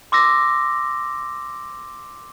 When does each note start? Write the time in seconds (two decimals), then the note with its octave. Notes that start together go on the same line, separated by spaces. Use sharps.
0.12 C6 D6 E6 A#6